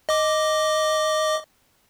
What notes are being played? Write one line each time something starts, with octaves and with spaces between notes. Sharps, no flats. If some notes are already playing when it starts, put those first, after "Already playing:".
D#5 D6